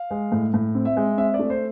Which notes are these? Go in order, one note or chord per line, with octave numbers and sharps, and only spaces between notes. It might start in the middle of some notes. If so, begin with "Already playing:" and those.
Already playing: F5
G#3
A2
A2
C4
E5
G#3
C4 E5
D5
A3
C5